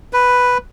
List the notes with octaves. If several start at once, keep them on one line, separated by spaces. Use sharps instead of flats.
B4